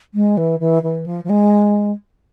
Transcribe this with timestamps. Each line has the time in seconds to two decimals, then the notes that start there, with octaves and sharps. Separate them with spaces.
0.14 G#3
0.37 E3
0.60 E3
0.83 E3
1.06 F3
1.24 F3
1.29 G#3